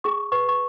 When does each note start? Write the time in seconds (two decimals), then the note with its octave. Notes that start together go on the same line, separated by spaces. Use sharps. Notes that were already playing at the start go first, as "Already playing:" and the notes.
0.04 G#4 C#6
0.32 B4 C#6
0.49 C#6